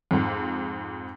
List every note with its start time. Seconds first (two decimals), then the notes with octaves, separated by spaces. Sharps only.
0.11 F2 G#2